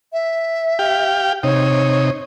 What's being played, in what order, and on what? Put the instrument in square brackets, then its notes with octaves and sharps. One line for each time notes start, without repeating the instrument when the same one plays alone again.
[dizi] E5
[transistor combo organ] G4 F5 G5
[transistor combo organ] C3 D#4 [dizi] C#5